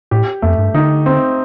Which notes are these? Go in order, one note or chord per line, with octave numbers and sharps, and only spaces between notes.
A2 G4
F2 A3
G2
D3 D#4
C4